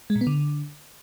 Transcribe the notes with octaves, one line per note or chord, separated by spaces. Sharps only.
G#3
A#2
B3
D3